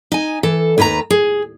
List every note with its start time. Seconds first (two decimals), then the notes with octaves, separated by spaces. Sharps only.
0.12 D#4 G#5
0.43 E3 A4
0.78 D#2 D#3 B4 C#5 A#5
1.10 G#4